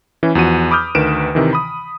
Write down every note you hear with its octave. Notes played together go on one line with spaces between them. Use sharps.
E3 C#4 E4
E2 F3 F#4 D#7
B5 D6 D#6 F6 G6
D2 D#3 B4 D7 E7
C3 D#3 E3
B5 D#6